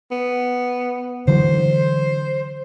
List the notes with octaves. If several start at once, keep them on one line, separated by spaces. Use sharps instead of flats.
B3
D3 E3 F#3 C5